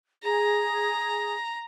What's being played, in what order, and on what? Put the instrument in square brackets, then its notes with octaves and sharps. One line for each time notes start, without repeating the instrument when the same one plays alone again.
[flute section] G#4 [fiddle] A#5